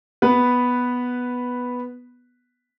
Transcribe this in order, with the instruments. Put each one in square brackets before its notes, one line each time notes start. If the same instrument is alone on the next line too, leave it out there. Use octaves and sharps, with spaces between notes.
[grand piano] B3 B4